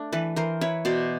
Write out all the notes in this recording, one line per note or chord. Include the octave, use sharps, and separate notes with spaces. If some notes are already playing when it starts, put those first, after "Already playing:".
Already playing: A3 D4
E3 A4 B4
E3 A#4 C5
E4 B4 C#5
B2 C5 D5